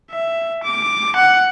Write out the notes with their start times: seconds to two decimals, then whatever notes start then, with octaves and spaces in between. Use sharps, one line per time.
0.11 E5
0.63 D6
1.16 F#5